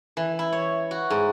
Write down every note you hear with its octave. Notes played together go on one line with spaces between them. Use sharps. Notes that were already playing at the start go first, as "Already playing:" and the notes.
E3
E4
C#5
F#4
G#2